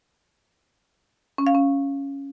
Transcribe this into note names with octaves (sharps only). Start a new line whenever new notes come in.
C#4
F5
C#4